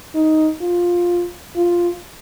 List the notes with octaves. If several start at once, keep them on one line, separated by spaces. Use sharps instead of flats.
D#4
F4
F4